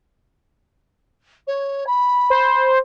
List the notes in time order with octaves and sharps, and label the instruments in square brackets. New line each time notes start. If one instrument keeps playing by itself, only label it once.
[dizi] C#5
B5
[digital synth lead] C5